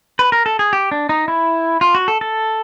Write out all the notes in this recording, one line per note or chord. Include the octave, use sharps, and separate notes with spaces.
B4
A#4
A4
G#4
G4
D4
D#4
E4
F4
F#4
A4
A4